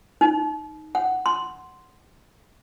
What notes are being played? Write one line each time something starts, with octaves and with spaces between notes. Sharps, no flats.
D#4
F#5
C6